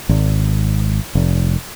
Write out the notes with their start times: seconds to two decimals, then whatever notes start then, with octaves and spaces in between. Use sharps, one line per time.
0.09 G#1
1.15 F1